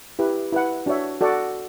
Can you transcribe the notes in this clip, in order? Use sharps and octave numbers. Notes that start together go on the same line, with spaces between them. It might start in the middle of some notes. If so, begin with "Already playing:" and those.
E4 G4 B4
E4 B4 F#5
D4 F#4 C#5 E5
F#4 A4 D5 F#5